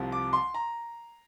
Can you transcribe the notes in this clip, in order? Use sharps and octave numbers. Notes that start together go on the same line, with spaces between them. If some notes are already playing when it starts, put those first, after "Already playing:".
Already playing: C2 C3 F3
D6
C6
A#5